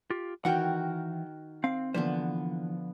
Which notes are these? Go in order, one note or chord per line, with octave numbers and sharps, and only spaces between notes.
F4 G4
D#3 E3 F#4 A#4 F#5 G5
C4 F5
D3 E3 F3 A#3 B3 C5